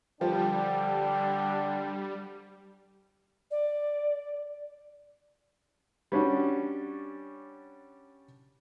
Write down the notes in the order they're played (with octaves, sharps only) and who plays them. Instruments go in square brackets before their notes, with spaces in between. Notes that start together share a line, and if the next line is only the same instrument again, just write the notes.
[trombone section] D3 D4 [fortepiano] F3 [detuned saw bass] G3 [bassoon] G4
[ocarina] D5
[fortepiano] G3 C#4 D4 F#4